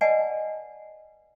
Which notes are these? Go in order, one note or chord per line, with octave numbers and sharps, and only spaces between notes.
B4 D5 D#5 F#5 G#5 A5